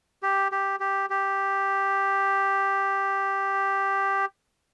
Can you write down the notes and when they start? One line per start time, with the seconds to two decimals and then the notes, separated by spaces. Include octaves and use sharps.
0.23 G4
0.52 G4
0.80 G4
1.10 G4